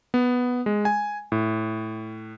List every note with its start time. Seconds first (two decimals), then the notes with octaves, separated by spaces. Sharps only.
0.14 B3
0.66 G#3
0.85 G#5
1.32 A2